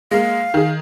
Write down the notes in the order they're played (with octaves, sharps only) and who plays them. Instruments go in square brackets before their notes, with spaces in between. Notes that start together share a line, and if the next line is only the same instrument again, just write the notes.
[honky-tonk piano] G#3 A#3 [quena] F5
[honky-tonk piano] D#3 G#4